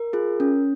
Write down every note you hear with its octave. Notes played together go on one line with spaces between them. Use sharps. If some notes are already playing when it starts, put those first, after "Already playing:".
Already playing: A#4
F4 G#4
C#4